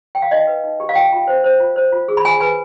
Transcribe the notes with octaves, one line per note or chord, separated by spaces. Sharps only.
G5
F5
D#4 D#5
B4
D#4
G4
F5
F4 G5
F4
C5
C5
F4
C5
F4
G#4
B5
F4 G#5
B4 G#5